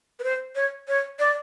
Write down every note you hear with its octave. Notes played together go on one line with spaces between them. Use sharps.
B4
C5
C#5
C#5
D5